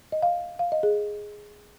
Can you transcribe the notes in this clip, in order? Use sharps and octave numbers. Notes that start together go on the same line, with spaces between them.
D#5
F5
F5
D#5
G#4